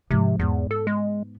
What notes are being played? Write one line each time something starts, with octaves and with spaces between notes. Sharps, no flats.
G#2 C3 F3
E2 G#2 B3
A4
G#3